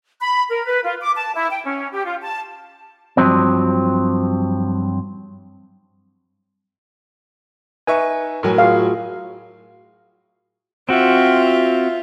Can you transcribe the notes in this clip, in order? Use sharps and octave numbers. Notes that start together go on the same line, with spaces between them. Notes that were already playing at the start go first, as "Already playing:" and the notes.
B5
A#4
B4
F4
D6
A5
E4
G5
C#4
G4
F4
A5
G2 F3 F#3 C4
D#4 B4 E5 G#5 C#6
A2 F#3 A#4 G#5
F4 F#4 G#4 F5
C4 F4 F#4 E5